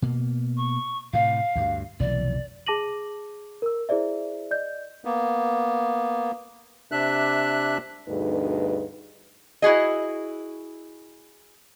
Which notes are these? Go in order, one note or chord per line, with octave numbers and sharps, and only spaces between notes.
B2 A#3
C#6
A2 C3 F5
D2 G2
F1 B1 E3 D5
G#4 A5 D6 A#6 D#7 F#7
A#4 E6
E4 G#4 C5 D5 E5
D5 D#5 G6
A#3 B3
C3 D4 E5 F#6
D2 G2 B2 D#4 G#4 B4
E4 F#4 G#4 D#5